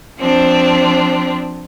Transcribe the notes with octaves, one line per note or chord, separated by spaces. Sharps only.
F3 C4 D4